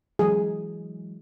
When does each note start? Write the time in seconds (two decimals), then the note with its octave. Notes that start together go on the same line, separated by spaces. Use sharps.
0.19 E3 F#3 G#3 G#4